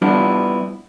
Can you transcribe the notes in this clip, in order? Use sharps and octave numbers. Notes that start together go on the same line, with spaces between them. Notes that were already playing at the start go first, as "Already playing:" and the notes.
G3 B3 D4 E4 F4 G4